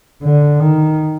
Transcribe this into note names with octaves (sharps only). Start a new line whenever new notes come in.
D3
D#3